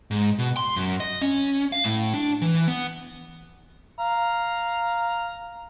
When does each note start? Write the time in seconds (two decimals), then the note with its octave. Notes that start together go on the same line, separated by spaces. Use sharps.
0.11 G#2
0.39 B2
0.57 C6
0.76 F#2
1.00 D#5
1.21 C#4
1.72 F5
1.84 A2
2.14 D4
2.42 E3
2.68 B3
3.98 F5 A#5